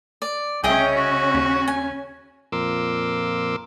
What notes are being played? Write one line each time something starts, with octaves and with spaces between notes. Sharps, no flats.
D5
C2 C#3 C#4 G#4 D#5 E5 G5
F#4
D#2
G#5
F2 A#2 A#4 C6 D6 E6